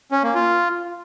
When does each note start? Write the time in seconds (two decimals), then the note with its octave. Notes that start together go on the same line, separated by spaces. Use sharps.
0.12 C#4
0.23 A#3
0.35 F4